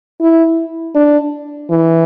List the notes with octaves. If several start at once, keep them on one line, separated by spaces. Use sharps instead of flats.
E4
D4
E3